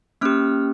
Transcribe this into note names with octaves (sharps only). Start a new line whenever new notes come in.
A#3 C#4 G4 F6